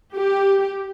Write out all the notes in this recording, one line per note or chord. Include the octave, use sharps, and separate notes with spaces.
G4